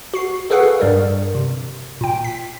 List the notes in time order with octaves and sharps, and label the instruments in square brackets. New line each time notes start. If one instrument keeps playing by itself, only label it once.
[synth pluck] F#4 C7
F#4 G#4 A4 B4 F5 F#5
G2 G3 A#4
C3
A#2 G5
B6